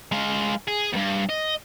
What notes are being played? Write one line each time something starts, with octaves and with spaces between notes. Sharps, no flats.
G#3 F5
G#4
E2 G2
D#5